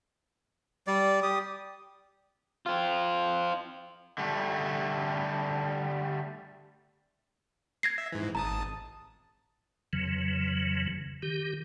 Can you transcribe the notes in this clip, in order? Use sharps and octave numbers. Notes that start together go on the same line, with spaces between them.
G3 D5
G4 D#6
C4 F4
D3 G3 A3
G#6 A#6 C7
E5
G#2 E3
G#1 A5 A#5 D#6
F2 C#3 E3 F#3
D#3 G4